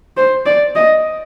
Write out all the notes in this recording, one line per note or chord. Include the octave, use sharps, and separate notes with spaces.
C5
D5
D#5